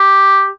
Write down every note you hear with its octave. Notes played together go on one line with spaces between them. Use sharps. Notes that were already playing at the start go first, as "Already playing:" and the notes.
Already playing: G4